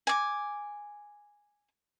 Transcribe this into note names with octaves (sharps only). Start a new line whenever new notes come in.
G#5 D6